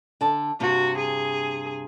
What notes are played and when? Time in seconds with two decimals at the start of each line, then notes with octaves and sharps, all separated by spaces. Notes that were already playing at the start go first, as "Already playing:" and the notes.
0.21 D3 A5
0.60 G2 C3 F#4
0.97 G#4